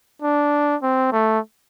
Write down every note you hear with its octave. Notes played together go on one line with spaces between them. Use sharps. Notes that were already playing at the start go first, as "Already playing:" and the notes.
D4
C4
A3